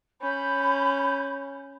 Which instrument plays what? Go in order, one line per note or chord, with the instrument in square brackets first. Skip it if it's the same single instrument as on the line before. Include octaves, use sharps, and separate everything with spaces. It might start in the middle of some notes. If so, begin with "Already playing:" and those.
[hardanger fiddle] C#4 [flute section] B5 G6